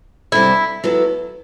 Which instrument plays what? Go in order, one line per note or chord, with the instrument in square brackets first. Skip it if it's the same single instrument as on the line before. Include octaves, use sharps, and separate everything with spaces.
[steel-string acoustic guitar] C3 G3 D4 A4 [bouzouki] E4
[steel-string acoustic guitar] F#3 B3 E4 A4